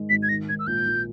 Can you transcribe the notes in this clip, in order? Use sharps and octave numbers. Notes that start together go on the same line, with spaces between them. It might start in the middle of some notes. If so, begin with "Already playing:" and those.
Already playing: G#2 D#3 G#3
G#1 B6
G#6
D#3 A#6
G#2 G#6
E6
A#1 G6
A#1